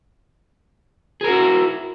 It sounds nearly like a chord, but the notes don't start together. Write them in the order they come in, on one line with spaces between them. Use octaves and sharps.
G#4 A#4 F#4 E4